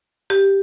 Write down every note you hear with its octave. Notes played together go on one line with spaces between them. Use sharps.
G4